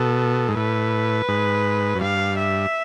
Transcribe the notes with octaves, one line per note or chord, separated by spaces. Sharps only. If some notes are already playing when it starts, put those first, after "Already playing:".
Already playing: B2 A4
G#2
A2 B4
G#2
F#2
G2 F5
E5